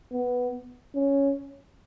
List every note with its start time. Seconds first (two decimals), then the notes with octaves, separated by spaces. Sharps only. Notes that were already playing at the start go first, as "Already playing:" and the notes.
0.11 B3
0.95 C#4